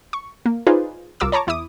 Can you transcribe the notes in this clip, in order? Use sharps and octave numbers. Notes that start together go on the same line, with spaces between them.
C#6
A#3
D#4 F4 G#4 B4 C5 D5
C2 F4 A#4 D6 E6
C#5 A5 A#5 C#6 D6
E2 E4 D6 D#6